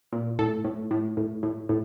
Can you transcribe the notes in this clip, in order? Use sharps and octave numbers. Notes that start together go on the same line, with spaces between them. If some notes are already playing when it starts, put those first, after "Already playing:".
A#2
A2 A4
A2
A2
A2
A2
A2